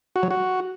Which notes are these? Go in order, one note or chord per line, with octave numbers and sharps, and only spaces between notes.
F#4
F#3
F#4